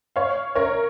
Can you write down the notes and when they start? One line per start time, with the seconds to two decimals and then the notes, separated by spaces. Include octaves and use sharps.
0.16 C#5 F5
0.55 A#4 C#5